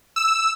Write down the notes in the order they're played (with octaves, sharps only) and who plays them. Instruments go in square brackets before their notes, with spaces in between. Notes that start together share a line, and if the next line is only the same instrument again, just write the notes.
[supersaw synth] E6